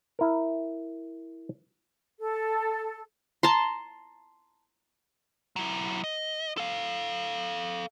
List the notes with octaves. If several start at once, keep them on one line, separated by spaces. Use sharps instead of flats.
E4 A#4
A4
A5 A#5 C6
F#3 E4
D#5
A4 F5